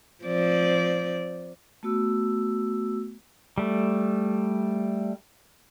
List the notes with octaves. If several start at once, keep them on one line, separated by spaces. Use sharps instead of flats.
F3 C4 D5
A3 B3 F#4 E6
G3 A3